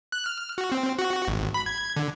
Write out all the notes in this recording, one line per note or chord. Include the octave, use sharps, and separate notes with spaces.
F#6
F6
F#4
C4
F#4
G#1
B5
G#6
D3